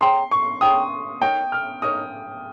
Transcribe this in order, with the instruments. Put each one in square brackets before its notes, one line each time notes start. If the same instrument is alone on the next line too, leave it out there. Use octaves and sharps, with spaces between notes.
[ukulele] G#4 C#5 G5 A#5 [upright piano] C6
[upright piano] C#6
[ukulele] G#4 C#5 G5 A#5 [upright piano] D#6
[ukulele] D#4 A#4 C#5 [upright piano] G5
[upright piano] F6
[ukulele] D#4 A#4 C#5 [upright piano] D#6